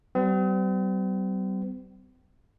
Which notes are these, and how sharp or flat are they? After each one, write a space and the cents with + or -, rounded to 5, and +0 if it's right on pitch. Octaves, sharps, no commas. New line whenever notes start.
G3 -35 C4 -45